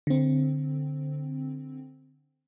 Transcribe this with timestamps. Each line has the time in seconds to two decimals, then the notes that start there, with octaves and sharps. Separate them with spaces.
0.07 D3 C4